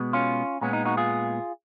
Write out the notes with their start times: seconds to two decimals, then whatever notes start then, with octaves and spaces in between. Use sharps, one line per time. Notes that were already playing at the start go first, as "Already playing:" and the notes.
Already playing: B2 G#3 B3
0.13 C#4 F4
0.61 A#2 G#3 B3 C#4
0.73 D#4
0.85 D#4 F#4
0.97 F4 G#4